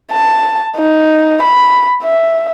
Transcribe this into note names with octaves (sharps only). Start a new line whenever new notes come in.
A5
D#4
B5
E5